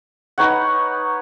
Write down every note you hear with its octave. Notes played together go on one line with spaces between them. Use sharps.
D#4 B4 C#5 F#5